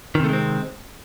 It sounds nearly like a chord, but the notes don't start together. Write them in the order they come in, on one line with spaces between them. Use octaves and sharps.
D#3 C3 A3 G#3 C4